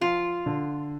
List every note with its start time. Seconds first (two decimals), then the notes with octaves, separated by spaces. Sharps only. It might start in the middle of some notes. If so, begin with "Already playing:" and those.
0.01 F3 F4
0.46 D3